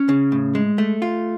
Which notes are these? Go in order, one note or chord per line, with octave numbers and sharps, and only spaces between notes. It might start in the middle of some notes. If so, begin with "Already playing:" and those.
Already playing: C#4
C#3
A2
G#3
A3
F4